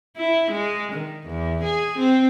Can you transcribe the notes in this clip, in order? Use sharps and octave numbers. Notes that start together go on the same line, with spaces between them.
E4
G#3
D#3
E2
G#4
C4